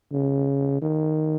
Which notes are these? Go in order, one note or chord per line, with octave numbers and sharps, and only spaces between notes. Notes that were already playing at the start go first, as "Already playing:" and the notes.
C#3
D#3